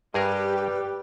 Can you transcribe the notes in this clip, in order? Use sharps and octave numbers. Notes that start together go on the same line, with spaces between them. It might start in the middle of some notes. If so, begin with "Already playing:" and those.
G2 G3 G4 G#4 A#4 B4